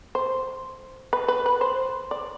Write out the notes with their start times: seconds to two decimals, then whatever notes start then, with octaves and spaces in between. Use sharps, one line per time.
0.15 C5
1.13 B4
1.28 B4
1.46 B4
1.61 C5
2.11 D5